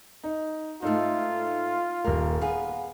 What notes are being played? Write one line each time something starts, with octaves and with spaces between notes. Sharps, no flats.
D#4
G#2 A3 D#4 F4 A4
D#1 A#3 A#4
B3 G#4 F5